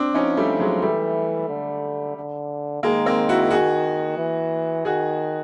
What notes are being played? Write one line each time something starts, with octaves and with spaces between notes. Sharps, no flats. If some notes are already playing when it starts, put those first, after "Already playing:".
Already playing: C4 D4
F3 C#4 D#4
G3 A3
F#3 G#3
E3 G3 A3
D3
D3
D#3 G#3 A#3
A#3 C4
E4 F#4
F#4 G#4
E3
D#3 F#4 G#4